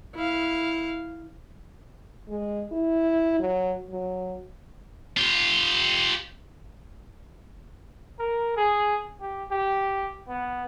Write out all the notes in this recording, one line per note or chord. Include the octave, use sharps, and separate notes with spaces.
E4 F5
G#3
E4
F#3
F#3
F4 G4
A#4
G#4
G4
G4
B3